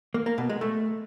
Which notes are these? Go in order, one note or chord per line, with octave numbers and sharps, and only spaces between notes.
A#3
A#3
B2
G#3
A3